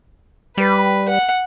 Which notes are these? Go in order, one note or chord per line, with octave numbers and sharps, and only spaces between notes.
G3 B4
F#5